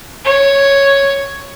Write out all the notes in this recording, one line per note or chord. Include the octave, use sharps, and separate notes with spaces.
C#5